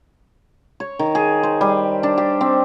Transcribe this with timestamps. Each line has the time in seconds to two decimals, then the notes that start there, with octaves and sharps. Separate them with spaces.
0.80 C#5
0.99 D#3
1.15 G#4
1.43 C5
1.61 G3
2.03 D4
2.18 G4
2.41 C4